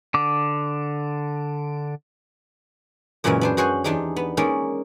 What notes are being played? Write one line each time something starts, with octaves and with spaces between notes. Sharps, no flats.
D3 D6
F#2 A#2 C#3 E3 F#3 G#3
B3 D4 C5
F#4 G#4 C5 C#5 F#5 G#5
E2 D4 D#4 G4 G#4
B3
G#3 A#3 C#4 D#4 D5